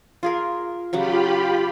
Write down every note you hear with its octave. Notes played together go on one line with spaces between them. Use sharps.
F4 G#4 A#4
C#3 F#3 F4 G4 F#5 B5